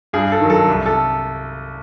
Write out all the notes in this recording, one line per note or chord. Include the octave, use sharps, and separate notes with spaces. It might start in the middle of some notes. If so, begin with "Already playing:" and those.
G2 G#4
A4
D#3 F#3
A4
C2
A4